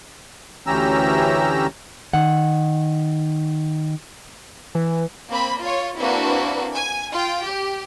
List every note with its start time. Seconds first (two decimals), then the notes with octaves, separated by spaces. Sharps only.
0.67 D2 E3 C#4 G4 A#5 E6
2.13 D#3 F#5
4.75 E3
5.29 A#3 C4 B5
5.60 F4 C#5
5.99 A#3 C4 D4 E4 F#4 B4
6.73 G#5
7.11 F4 G5
7.45 G4